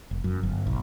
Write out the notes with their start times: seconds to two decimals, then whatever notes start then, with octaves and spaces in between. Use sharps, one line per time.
0.11 F1
0.24 F#2
0.43 G1
0.67 B1